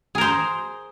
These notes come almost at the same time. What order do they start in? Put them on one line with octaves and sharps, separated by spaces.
G#4 A#4 C5